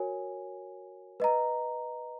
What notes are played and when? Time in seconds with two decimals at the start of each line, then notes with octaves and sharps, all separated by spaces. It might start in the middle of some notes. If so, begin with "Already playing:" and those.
Already playing: F#4 A#4 C#5 G#5
1.20 B4 D#5 A#5